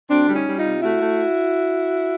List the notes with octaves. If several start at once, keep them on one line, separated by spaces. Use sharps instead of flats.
D2 C4 D4
G3
C#4 D#4
G3
D#4 F4
C3
A3 E4 F#4
A3